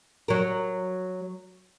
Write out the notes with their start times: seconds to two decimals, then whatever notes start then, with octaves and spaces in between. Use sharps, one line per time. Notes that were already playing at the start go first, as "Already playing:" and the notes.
0.28 F#3 A#4